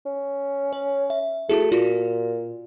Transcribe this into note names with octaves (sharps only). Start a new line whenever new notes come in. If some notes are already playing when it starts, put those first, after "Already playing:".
C#4
C#5
E5
A3 E4 F#4 G#4
A#2 F4 F#4